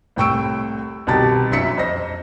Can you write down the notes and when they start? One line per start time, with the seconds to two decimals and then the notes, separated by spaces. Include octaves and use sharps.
0.16 C2 A2 G5 C#6 E6 D7
1.07 C2 B2 D#3 G4 A5 A6
1.51 A#1 F#2 E4 E5 B6 C#7
1.77 F2 C5 D#5 A#6